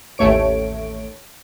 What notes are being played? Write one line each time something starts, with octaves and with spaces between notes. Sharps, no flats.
A1 D#2 A3 C#5 D7